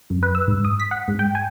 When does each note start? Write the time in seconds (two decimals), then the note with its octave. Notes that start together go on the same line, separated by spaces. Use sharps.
0.10 F#2
0.23 B4
0.35 E6
0.48 G#2
0.65 D#6
0.80 B6
0.91 F#5
1.08 G#2
1.19 G5
1.35 G#5